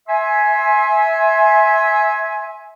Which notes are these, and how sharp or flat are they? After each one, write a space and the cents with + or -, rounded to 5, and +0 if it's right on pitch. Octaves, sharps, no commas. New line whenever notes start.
E5 -10 G#5 +10 C6 +25